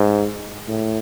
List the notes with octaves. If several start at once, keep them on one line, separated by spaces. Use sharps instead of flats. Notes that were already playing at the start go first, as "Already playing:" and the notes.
Already playing: G#2
A2